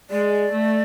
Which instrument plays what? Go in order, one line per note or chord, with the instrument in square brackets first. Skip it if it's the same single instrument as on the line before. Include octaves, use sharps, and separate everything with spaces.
[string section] G#3 [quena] D5
[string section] A3